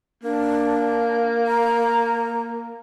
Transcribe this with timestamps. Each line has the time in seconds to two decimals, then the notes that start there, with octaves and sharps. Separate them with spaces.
0.23 A#3 D4
1.46 A#5